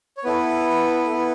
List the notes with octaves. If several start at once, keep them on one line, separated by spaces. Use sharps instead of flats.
C#5
B3 E4 A4 B4
B3 E4 A4